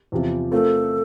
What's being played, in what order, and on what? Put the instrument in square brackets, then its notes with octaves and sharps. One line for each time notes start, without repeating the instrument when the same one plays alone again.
[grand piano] E2 C3 F3
[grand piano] A3 C4 F4 A#4 [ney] A4